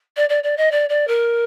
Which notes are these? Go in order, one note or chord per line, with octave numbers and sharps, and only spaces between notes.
D5
D5
D5
D#5
D5
D5
A#4